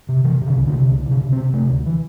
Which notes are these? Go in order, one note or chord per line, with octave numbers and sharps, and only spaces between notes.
C3
C3 E3
C3
D3
C2
D3
C3
C2 D3
C3
D3
C3
C4
C3
C3 A3
D2
E3